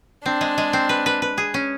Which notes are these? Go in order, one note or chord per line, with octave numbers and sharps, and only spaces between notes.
C4 D4
G#3
G#3
C4
B4
B4
B4
G#4
C#4